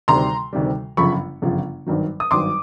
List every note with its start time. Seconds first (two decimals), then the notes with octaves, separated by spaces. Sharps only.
0.08 D2 C3 D#3 G3 A#5 C6
0.53 D2 C3 D#3 G3
0.97 G1 F#2 C#3 F3 B5 C#6
1.42 G1 F#2 C#3 F3
1.86 G#1 G2 D#3 F#3
2.20 D#6
2.31 G#1 G2 D#3 F#3 C6 D6